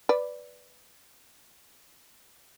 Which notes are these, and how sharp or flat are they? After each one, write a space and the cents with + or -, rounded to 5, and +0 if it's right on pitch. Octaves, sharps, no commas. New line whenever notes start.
B4 +0 D5 +0